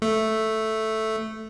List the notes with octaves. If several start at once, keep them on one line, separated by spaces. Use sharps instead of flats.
A3